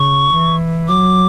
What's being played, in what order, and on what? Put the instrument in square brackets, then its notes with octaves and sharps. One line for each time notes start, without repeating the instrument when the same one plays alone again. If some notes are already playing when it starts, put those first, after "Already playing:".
Already playing: [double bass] C#3 [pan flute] C#6
[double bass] E3
[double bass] F#3 [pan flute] D6